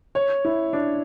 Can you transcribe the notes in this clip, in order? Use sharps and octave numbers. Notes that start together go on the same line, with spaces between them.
C#5
E4
D4